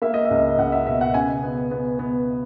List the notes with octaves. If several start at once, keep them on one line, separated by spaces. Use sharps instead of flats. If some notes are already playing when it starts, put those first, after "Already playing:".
A#3 E5
D#5
E5
C#2
C#2 F#5
E5
B2 E5
F#5
C#3 G#5
B3
B3
B3